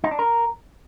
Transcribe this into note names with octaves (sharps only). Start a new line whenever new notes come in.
D#4
D4
A#4